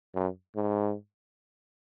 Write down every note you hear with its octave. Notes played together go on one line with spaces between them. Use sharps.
F#2
G#2